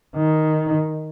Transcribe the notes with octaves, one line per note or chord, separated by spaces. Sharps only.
D#3